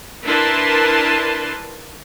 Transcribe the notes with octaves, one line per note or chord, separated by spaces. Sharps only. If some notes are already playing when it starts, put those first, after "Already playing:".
D4 E4 A#4 B4 A5 C6